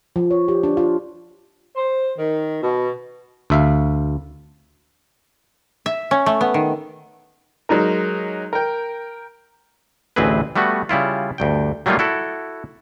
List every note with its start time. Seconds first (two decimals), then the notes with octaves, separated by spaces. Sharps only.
0.16 F3
0.31 C#5
0.48 G4
0.63 D4
0.77 F4
1.76 C5
2.17 D#3
2.61 B2
3.50 D2 E5 F5
5.86 E5
6.11 C#4
6.26 A3
6.41 B3
6.54 D#3
7.69 F#3 G#3 D#4 A#4
8.53 A#4 G5
10.16 A1 D2 E3 C4 G#4 B4
10.56 G3 A3 B3 F#4
10.89 C#3 G3 E4 F4
11.38 D2 G2 G5
11.86 F#3 G3 A3 A#3 D#4 F4
11.99 E4 F#4 A4